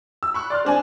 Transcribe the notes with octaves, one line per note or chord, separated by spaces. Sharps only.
E6
B5 C#6 F#6
D5 C6 F6
C4 D4 G#5